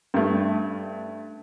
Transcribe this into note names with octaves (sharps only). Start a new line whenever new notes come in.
G2 A3